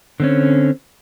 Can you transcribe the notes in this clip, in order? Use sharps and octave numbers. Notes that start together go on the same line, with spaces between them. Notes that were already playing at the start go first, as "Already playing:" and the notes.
D3 C4 C#4